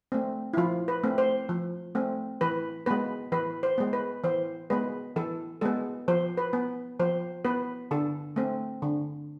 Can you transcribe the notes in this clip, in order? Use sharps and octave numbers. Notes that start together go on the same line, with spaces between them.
A3 C4
E4
F3 F4
B4
A3 C4
C5
F3
A3 C4
E3 B4
G#3 B3 B4
E3 B4
C5
G#3 B3
B4
E3 C5
G#3 B3 B4
E3 A4
G#3 B3 A4
F3 C5
B4
B3
F3 C5
B3 B4
D3 A4
A3 C4
D3